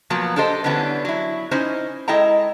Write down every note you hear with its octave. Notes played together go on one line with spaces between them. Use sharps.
B2 F3 F#3 A#3 B3
D4 G4 A4 C5 D#5
D3 E3 G3 B3 C#4 D4
F#3 E4
C#4 D#4 E4 C5 D#5 G#5
G#3 E4 A4 D#5 G5 A#5